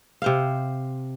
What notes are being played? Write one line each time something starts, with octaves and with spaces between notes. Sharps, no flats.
C3 C5 F5